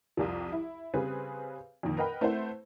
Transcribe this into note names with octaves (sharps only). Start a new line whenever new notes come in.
C2 F2 C3 F3
E4
C#3 G3 C4 G#4 B4 G#5
F2 A#2 D#3
A#4 B4 D#5 F#5 G5 B5
A3 C4 E4 B4 C5 F#5